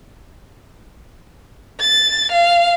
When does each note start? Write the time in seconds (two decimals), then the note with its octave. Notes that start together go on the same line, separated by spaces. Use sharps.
1.80 A6
2.32 F5